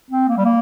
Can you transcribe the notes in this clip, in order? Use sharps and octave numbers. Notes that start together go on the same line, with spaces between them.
C4
A#3
G3
A#3